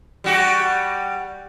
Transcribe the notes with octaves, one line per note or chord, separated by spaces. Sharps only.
G3 F#4 G4